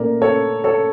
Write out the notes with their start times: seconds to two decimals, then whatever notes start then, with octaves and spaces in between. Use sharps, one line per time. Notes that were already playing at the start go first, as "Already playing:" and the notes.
Already playing: A#2 A3 C#4 A#4 D5
0.22 A4 C#5
0.64 A4 C#5